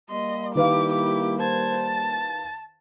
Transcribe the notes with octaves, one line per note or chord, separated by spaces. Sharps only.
G3 A#3 D#5 C6
D#3 E4 G4 B4 F5 D6
D6
C5 A5 G#6
A6